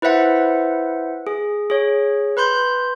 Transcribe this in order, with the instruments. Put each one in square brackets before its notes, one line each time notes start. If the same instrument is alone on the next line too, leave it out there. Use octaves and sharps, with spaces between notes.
[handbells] E4 B4 C5 E5 F#5
G#4
G#4 C#5
B4 B5 C6 G6